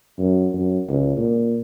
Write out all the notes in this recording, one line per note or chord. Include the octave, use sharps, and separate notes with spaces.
F#2
F#2
C#2
A#2